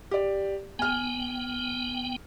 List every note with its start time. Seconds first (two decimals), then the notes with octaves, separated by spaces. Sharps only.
0.11 G4 D5
0.79 B3 G5 G#5 F6